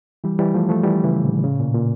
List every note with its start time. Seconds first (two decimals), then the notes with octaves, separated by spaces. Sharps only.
0.24 E3 G3
0.39 E3 G3
0.54 F3 A3
0.69 F3 A3
0.84 E3 G3
1.04 C#3 E3
1.24 A#2 D3
1.44 A2 C#3
1.60 A#2
1.74 A#2